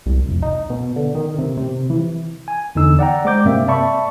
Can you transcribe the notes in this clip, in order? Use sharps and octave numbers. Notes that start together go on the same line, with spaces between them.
C2
F1
D#4
B2
D3
D#3
C3
C3
E3
G#5
E2 D3 D#4 E6
D5 F#5 G5 A#5
G#3 C5 D6 G6
G2 C3 A#3 C4 E5
D5 E5 A5 B5 C#6